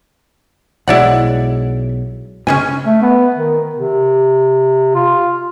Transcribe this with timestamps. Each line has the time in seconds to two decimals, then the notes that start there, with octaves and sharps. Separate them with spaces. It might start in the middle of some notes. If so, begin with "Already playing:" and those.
0.88 B1 F#3 G#3 E4 D5 F#5
2.47 A#2 C#3 C#4 D#4 G#5
2.86 A3
3.02 B3
3.36 D#3
3.75 C3
4.95 F4